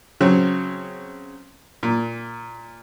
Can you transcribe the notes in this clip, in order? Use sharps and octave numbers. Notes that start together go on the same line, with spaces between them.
C#3 F#3 C4
A#2